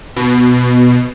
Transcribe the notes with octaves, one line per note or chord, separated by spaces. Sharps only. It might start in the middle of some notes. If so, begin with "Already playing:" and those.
B2